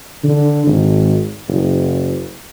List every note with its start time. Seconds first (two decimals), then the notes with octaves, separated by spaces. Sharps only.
0.24 D3
0.67 G#1
1.48 F#1